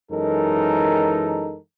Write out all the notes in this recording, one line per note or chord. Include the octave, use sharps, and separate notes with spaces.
F#2 E3 G#3 D#4 A4 A#4